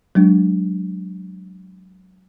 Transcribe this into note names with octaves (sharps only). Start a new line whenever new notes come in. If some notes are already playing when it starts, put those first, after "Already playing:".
F#3 G#3 D4